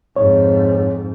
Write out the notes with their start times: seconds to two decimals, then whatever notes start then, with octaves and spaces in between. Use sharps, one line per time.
0.16 F2 G#2 C#5